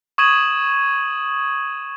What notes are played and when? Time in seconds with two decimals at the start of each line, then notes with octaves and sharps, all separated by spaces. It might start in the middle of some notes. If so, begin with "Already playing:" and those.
0.18 C#6 D#6 G#6 D#7 E7 F#7